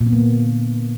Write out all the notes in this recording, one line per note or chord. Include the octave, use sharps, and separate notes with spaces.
A#2
B3
A#3
D3